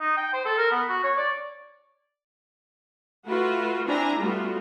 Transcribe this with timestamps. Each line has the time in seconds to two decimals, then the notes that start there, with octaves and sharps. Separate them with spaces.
0.01 D#4
0.17 G5
0.33 C5
0.46 A4
0.58 A#4
0.72 B3
0.89 F#4
1.04 C#5
1.18 D5
3.26 A3 F4 F#4 B4
3.87 C4 D4 E4 G#5 A#5
4.20 G3 A3 B3 F4 F#4